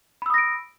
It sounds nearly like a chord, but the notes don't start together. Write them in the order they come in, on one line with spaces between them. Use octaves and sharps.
B5 E6 D#6 A#6 D7